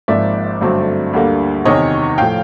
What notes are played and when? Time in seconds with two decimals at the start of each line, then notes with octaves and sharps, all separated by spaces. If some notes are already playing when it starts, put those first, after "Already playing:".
0.08 G#1 G#2 F3 A#3 D5 E5
0.61 G2 D3 F#3 A3 C4
1.13 D2 D3 G3 A#3
1.65 E2 C3 D#3 C#5 D#5
2.18 A2 F3 F5 G5